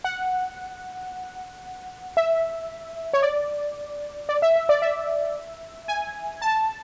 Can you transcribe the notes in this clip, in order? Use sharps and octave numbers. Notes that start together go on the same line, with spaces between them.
F#5
E5
C#5
D5
D5
E5
E5
D5
E5
G#5
A5